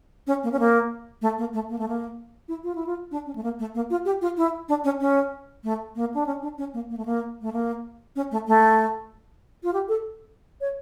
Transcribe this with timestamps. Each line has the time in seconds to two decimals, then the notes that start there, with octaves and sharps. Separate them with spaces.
0.27 C#4
0.43 A#3
0.52 C#4
0.59 A#3
1.22 A3
1.38 A#3
1.54 A3
1.69 A#3
1.79 A3
1.88 A#3
2.48 E4
2.64 F4
2.75 E4
2.87 F4
3.11 D4
3.26 C#4
3.36 A3
3.43 A#3
3.59 A3
3.75 A#3
3.90 F4
4.05 G4
4.21 F4
4.37 E4
4.69 D4
4.84 C#4
5.01 C#4
5.64 A3
5.96 A#3
6.14 D4
6.26 C#4
6.42 D4
6.58 C#4
6.74 A#3
6.90 A#3
6.97 A3
7.05 A#3
7.41 A3
7.52 A#3
8.16 C#4
8.31 A3
8.47 A3
9.64 F4
9.73 G4
9.89 A4
10.61 C#5